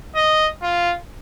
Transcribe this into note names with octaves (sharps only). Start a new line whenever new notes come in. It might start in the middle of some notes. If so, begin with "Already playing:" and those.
D#5
F4